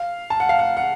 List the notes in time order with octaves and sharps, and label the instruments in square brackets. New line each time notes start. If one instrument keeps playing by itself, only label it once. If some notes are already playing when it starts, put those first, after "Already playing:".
Already playing: [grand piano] F5
A5
F#5
F5
F#5
F#5